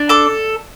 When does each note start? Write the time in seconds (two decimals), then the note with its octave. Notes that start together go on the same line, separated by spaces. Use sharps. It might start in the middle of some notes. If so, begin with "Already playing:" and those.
Already playing: D4
0.09 A4 D6